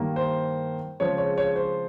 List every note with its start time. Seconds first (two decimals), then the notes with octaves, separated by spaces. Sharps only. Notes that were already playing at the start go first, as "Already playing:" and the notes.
Already playing: G2 D#3 A#3
0.16 C5
1.00 C#3 F3 G#3 C4 C#5
1.18 C#5
1.38 C#5
1.56 C5